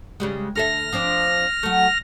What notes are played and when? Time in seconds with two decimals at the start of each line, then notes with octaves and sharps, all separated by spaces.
0.20 C#3 G3 G#3
0.55 D2 A4 E5 F6 A#6
0.92 F3 C4 D4
1.63 F#3 A3